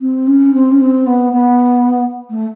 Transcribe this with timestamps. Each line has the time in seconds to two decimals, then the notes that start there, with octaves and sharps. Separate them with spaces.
0.01 C4
0.27 C#4
0.54 C4
0.71 C#4
0.81 C4
1.06 B3
1.32 B3
2.30 A3